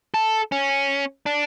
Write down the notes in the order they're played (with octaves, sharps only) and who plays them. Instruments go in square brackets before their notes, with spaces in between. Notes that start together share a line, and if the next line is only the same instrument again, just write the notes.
[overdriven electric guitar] A4
C#4
D4